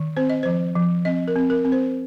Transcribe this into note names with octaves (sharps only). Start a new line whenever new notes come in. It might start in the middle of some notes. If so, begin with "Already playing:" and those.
Already playing: D#3
C4 C5
D#5
F3 C5
F3
C4 D#5
A#4
C4
A#4
C4
C5